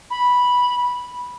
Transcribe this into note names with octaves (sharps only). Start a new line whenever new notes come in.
B5